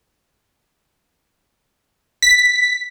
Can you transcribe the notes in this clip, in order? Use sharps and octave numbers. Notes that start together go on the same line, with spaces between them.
B6